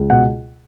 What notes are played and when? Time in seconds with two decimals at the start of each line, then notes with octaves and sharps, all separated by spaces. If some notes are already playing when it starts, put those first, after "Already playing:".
Already playing: C#2
0.10 B2 F#5